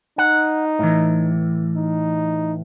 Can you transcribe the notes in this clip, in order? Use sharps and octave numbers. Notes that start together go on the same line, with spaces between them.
D#4 F#5
A2 E3
D#4